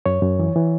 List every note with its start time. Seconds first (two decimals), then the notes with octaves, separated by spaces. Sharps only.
0.06 F#2 C#5
0.22 F#2
0.39 E3
0.56 E3